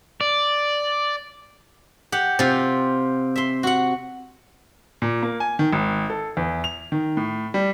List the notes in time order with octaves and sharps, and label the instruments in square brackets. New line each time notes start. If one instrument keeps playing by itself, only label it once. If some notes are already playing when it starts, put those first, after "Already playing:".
[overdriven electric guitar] D5
[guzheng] G4 F#5
C3 F4
E5 C6
F#4 F#5
[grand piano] A#2
A#3
G#5
D#3
G#1
A4
E2
F7
D#3
A2
G3